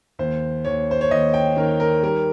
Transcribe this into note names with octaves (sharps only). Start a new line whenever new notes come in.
D#2 C5
D#2 C#5
C5
C#5
D#2 D#5
G5
D#3 A#4
A#4
G3 A#4